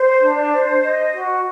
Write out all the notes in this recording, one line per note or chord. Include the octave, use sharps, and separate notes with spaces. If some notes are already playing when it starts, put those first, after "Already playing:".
Already playing: C5
D4
C5
D#5
F#4